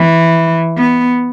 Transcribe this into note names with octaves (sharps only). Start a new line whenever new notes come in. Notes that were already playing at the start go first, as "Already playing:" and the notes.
Already playing: E3
B3